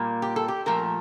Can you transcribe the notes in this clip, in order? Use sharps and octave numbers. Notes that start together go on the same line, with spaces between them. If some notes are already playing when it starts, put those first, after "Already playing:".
Already playing: A#2 G3 A#3
G4
A4
G4
A#2 F3 A3 A#4